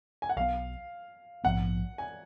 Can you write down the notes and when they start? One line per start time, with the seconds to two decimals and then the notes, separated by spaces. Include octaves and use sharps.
0.22 G#5
0.29 F#5
0.36 B1 A#2 F#3 B3 F5
1.44 A#1 G#2 F3 B3 F#5
1.98 G#5